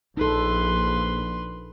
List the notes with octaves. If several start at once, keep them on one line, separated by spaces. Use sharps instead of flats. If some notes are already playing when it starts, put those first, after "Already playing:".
A#1 D#4 A4 B4 C6